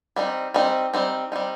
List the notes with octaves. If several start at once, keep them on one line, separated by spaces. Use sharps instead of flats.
G3 C4 D#4
G3 C4 D#4
G3 C4 D#4
G3 C4 D#4